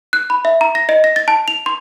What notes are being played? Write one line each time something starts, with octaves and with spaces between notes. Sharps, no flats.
F#6
B5
E5
A#5
A#6
D#5
A#6
A6
A5
F7
C6